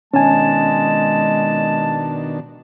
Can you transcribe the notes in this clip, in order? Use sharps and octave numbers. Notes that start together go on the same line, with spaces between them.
B2 D#3 G#3 C#4 D4 G#5 A5